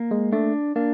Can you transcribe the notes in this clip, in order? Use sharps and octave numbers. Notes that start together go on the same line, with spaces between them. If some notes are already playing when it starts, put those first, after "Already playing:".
Already playing: A#3
G#3
A3 D4
A#3 D4